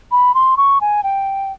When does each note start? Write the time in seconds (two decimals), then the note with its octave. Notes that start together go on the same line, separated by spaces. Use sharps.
0.11 B5
0.34 C6
0.57 C#6
0.81 G#5
1.03 G5